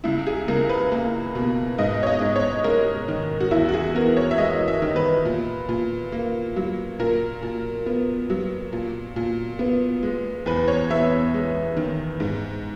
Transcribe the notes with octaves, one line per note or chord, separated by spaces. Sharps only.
C#2 E4
G#4
C#2 A#4
B4
A#3
B2
G#2 D#5
C#5
D#5
G#2
C#5
G#3 A#4
D#3
F#4
E2 E4
F#4
G#4
B3 A#4
C#5
E5
G#3 D#5
E5
D#3
B4
A#2
A#2
A#3
F#3
A#2 A#4
A#2
B3
F#3
A#2
A#2
B3
G#3
E2 B4
C#5
B3 E5
G#3
D#3
G#2